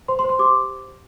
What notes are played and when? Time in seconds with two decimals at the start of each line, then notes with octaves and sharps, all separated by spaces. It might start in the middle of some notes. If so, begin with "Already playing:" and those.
0.08 C5 C6
0.19 C6
0.24 C5
0.29 C6
0.39 G4 D6